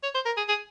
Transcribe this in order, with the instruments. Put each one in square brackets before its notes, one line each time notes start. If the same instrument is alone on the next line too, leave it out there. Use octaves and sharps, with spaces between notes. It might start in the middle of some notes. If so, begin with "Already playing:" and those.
[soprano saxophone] C#5
C5
A#4
G#4
G#4